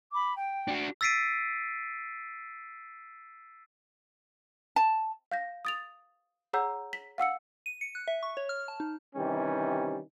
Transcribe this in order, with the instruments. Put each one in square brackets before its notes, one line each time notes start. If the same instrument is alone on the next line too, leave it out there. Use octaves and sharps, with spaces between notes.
[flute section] B5 D6
G5
[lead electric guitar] D4 F#4
[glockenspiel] E6 A6 B6 C7 D7 D#7
[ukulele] A5
[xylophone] F5 G6 A#6
D#6 A6 F7
G#4 C#5 F#5 A#5 E6 G6
B6
F5 F#5 E6 C#7
[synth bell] D#7
C#7
F#6
E5
C#6
C#5
F6
A5
D#4
[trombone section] C3 D#3 E3 G3 C#4